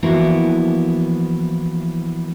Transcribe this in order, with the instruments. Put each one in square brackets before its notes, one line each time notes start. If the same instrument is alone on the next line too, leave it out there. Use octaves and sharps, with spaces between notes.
[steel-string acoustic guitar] E3 F3 A#3 B3 E4 F#4